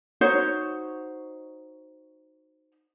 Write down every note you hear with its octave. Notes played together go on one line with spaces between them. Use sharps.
D#4 F#4 C5 C#5